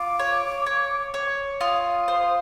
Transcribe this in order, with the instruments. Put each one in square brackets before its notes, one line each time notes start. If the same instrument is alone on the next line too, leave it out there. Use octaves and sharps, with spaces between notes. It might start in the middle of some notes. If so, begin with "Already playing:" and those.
Already playing: [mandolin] F4 [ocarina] D6
[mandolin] C#5
C#5
C#5
[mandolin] F4 [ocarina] D#6
[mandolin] C5